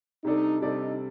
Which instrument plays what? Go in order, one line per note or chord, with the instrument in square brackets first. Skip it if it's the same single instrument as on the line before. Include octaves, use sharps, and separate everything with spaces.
[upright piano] C3 G3 D4 A4 D5 [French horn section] D#4
[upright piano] C3 G3 D4 A4 D5 [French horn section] D#4